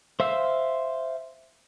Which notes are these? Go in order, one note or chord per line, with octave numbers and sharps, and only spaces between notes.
C5 E5 F5 E6